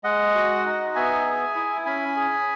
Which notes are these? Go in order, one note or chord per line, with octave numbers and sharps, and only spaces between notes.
G#3 D#5 F#5
F#4
D#4
B3 E5 G#5
G#4
E4
C#4 G#5 B5
G#4